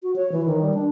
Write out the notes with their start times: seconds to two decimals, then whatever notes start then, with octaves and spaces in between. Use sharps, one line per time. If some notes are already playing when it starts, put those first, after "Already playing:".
0.03 F#4
0.16 C#5
0.32 E3
0.46 D#3
0.62 G3
0.74 D4